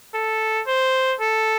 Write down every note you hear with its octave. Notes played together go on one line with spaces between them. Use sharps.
A4
C5
A4